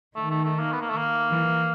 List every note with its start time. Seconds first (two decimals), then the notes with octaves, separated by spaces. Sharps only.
0.16 D#3 A3
0.31 A3
0.45 A3
0.59 A#3
0.72 B3
0.81 A#3
0.89 A3
0.97 A#3
1.29 E3